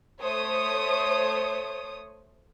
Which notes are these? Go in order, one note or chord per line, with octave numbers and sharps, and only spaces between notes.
A3 C5 C#5 D#6